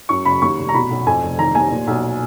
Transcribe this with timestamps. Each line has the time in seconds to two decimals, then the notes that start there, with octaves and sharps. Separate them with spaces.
0.09 F#2 C#6
0.25 F#1 B5
0.42 D#2 C#6
0.59 F1
0.69 A#5
0.74 B2 B5
0.91 B1
1.06 F2 G#5
1.23 F1
1.39 D#3 A#5
1.55 D#2 G#5
1.71 A#2
1.87 B1